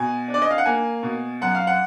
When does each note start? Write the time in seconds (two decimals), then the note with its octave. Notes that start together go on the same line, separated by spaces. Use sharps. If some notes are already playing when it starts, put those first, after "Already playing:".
Already playing: B2 G#5
0.28 D4
0.34 D5
0.42 D#5
0.51 F5
0.58 F#5
0.65 A#3 G#5
1.03 B2
1.41 F#2 F#5
1.55 F5
1.67 F#5